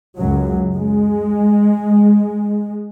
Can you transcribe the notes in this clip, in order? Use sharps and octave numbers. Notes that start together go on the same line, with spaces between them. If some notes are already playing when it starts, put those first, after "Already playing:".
C#2 F#2 F#3
G#3